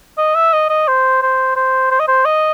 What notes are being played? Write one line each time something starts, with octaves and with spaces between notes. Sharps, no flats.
D#5
E5
D#5
D#5
C5
C5
C5
C5
D#5
C5
D#5